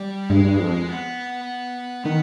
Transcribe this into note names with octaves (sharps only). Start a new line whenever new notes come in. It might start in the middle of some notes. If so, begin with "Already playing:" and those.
Already playing: G3
G2 G#3
G2
F2
B3
D#3 B3